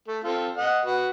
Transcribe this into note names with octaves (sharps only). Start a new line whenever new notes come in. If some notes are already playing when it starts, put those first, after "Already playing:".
A3
C4 F4 A4
D#5 F#5
F#4 B4